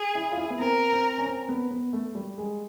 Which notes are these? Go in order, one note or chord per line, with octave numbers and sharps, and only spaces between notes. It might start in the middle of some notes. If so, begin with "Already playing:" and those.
Already playing: G#4
E4
F4
E4
B3
C4 A#4
C4
C#4
C4
B3
B3
A3
G3
G#3